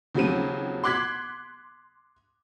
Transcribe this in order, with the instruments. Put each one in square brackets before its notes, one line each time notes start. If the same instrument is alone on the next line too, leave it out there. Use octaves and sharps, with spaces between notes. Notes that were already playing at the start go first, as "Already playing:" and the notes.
[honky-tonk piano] D#2 C#3 F3 F#3 C4 D#7
C6 D6 F#6 G#6 B6